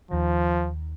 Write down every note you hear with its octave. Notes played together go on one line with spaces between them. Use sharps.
D#2 D#3 F3